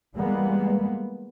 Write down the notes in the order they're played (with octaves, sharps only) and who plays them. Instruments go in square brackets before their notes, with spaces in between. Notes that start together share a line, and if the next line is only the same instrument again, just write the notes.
[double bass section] E3 G3 G#3 A#3 B3